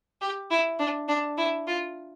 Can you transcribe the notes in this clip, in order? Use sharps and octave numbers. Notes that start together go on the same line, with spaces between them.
G4
E4
D4
D4
E4
F4